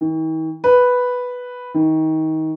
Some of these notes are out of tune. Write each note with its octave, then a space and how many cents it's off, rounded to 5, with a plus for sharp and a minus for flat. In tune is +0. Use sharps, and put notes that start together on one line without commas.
D#3 +45
B4 +0
D#3 +25